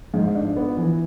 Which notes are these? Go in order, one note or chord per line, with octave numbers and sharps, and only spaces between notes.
G#2
D4
B3
E3